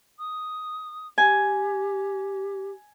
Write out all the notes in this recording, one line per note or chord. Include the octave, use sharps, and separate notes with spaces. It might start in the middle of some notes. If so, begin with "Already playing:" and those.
D#6
G4 G#5